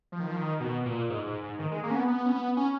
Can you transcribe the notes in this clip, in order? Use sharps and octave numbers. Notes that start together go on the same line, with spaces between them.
F3
D#3
F3
D#3
B2
A#2
G#2
G#2
G#2
D#3
G#3
A#3
C#4
B3
B3
C#4
B3
C#4